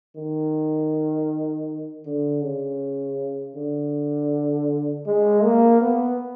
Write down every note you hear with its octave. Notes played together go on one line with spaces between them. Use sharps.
D#3
D3
C#3
D3
G#3
A#3
B3